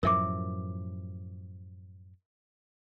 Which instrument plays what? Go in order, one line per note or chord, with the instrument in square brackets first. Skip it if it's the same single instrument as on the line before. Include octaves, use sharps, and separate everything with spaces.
[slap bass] F#2 A2 F3 [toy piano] A#4 E5 D6